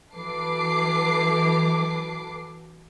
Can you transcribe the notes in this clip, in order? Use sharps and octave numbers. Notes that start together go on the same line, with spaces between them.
E3 F#3 A4 B4 D6 C7